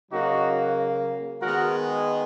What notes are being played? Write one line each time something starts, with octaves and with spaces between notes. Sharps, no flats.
C#3 F#3 A#3 D#4 F#4
D#3 G#3 B3 F#4 A#4